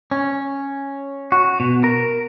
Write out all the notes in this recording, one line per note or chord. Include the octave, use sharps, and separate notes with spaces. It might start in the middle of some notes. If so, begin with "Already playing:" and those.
C#4
F#4
B2
A#4